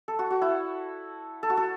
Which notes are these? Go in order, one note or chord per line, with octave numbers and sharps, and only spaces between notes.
A4
F#4
F#4
E4
A4
F#4
A4